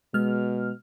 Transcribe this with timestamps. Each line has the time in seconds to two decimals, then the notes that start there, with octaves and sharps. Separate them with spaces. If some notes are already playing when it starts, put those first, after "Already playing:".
0.14 B2 G#3 F6